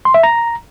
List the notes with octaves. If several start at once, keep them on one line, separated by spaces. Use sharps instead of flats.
C6
E5
A#5